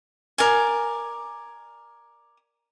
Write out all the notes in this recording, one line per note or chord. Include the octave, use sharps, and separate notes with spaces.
A#4 D5 G#5